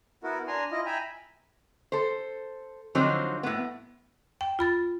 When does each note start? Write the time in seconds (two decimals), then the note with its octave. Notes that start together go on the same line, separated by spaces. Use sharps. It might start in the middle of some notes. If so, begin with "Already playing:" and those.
0.24 B3 E4 F#4 A#4
0.48 D4 G#5 A#5 C6
0.72 E4 F4 D#5
0.86 E5 G5 G#5 A#5 B5
1.92 A4 C5
2.95 D3 F3 F#3 C4 D#4 C5
3.43 A2 B3
4.41 G5
4.59 F4 B5 A6